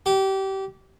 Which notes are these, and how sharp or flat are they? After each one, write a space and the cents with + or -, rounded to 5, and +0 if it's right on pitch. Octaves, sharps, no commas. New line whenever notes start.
G4 -25